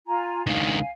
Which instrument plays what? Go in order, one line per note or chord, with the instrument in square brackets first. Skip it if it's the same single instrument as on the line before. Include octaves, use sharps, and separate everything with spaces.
[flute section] F4 G#5 A#5
[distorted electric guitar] C#2 D#3 [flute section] F5 G#5